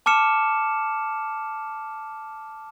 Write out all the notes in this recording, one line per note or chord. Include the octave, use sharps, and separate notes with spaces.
A5 D6 F6 C#7 E7